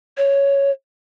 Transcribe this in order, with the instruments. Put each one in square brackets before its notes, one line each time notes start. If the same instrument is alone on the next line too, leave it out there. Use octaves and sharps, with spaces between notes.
[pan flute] C#5